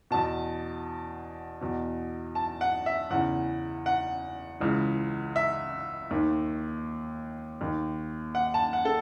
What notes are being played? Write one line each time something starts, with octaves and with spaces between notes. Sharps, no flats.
E2 B2 A5
E2 B2
A5
F#5
E5
E2 C#3 E3 F#5
F#5
C#2 C#3 E3
E5
D#2 D#3
D#2 D#3
F#5
A5
F#5
A4